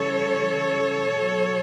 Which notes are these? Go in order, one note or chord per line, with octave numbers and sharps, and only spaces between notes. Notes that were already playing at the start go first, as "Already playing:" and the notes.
Already playing: C#3 E3 G3 A4 C#5
B2 F#3